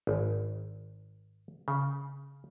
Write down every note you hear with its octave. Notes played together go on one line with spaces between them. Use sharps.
G#1
C#3